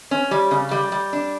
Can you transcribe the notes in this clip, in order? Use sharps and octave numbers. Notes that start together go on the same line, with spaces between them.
C#4
G3
C#3
G3
G3
D4